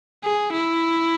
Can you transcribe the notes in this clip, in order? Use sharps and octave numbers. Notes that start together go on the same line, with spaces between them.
G#4
E4